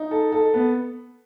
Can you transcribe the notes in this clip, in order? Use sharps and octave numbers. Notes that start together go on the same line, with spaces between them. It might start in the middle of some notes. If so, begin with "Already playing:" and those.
Already playing: D#4
A4
A4
B3